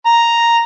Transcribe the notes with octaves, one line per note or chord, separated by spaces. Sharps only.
A#5